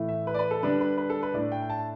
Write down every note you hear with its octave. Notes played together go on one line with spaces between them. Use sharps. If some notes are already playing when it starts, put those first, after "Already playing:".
Already playing: A2 E3 A3
E5
B4
D5
B4
A4
D3 G3 D4 B4
B4
B4
A4
B4
A2 A3 D4 D5
G5
G5
A5